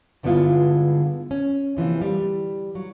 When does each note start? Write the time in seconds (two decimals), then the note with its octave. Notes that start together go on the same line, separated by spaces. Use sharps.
0.23 G2 D3 G#3 B3 E4 F4
1.31 C#4
1.77 C3 E3 F3 A#3
2.02 G3
2.75 F#3